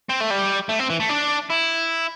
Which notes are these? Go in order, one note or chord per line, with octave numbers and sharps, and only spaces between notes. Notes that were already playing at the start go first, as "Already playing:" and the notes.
C4
A3
G3
A3
C4
E3
A3
D4
E4